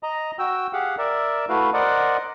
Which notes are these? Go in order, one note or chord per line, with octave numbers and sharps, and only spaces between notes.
D#5 A#5
F#4 G5 E6
G4 G#4 F5 F#5
A#4 D5 E5
A3 E4 F#4 B4 F5
A#4 C5 D5 D#5 F#5